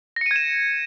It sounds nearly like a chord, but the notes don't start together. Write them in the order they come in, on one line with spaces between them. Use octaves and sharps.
A#6 C#7 D#7 G#6 E7